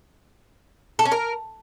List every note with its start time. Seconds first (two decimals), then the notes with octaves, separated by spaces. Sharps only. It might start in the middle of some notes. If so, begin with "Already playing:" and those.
0.99 A4
1.05 C#4
1.12 A#4